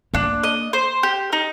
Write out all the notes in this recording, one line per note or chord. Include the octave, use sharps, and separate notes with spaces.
A#3 D4
D#5
C5
G4
D#4